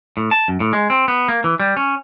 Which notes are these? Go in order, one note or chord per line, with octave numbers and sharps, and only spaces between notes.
A2
A5
F#2
A2
G#3
C4
B3
A#3
E3
G3
C#4